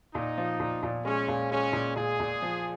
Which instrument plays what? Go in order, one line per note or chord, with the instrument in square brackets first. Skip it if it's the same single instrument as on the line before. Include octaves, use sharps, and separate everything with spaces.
[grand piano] A#2 [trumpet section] D#4
[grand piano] F3
A#2
A#2
[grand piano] G#3 [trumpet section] C#4
[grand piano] A#2
[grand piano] G#3 [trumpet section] C#4
[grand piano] A#2
[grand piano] A#2 [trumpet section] G#4
[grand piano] A#2
F3